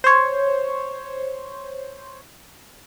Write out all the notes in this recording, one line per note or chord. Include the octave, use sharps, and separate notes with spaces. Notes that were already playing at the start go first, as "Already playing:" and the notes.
C5 C#5